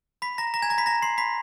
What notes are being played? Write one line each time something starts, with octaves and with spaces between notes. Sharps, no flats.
B5 B6
A#5 A#6
A#5 A#6
G#5 G#6
A#5 A#6
B5 B6
A#5 A#6
C6 C7
B5 B6